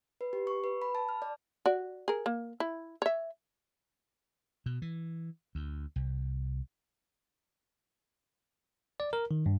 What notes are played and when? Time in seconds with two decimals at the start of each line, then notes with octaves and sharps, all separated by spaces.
0.21 B4
0.33 G4
0.47 C#6
0.64 B4
0.82 B5
0.95 A5
1.09 F6
1.22 D5
1.66 F#4 D5
2.08 G#4 A#4
2.26 A#3
2.60 E4
3.02 C#5 E5
4.66 B2
4.82 E3
5.55 D2
5.96 C2
9.00 D5
9.13 A#4
9.31 D#3
9.46 G2